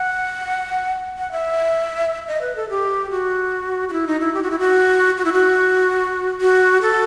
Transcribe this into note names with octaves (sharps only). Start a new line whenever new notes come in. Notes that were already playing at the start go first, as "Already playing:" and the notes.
Already playing: F#5
F#5
E5
D#5
B4
A4
G4
F#4
F#4
E4
D#4
E4
G4
F#4
E4
F#4
F#4
E4
F#4
F#4
A4